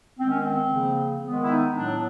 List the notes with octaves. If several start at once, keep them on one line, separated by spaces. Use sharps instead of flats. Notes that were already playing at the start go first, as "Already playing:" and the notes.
D#3 G#3 B3 C4
C#4
C4
C#3 F3 A#3
D#3 G#3 B3
E4
D#4
A2 F#3 B3 D4